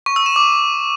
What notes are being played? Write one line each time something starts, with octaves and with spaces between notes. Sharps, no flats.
C#6
E6
E7
D6